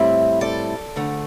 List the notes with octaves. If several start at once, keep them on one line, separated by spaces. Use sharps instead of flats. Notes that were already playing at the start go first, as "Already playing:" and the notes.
Already playing: A2 G3 C4 E4 E5
A4 D5
D2 D3 A3